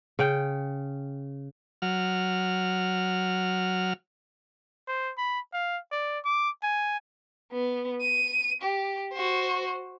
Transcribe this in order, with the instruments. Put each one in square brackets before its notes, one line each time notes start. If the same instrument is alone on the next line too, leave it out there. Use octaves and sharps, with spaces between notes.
[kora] C#3 G5
[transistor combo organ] F#3 F6
[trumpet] C5
B5
F5
D5
D6
G#5
[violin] B3
D#7
G4
F#4 C5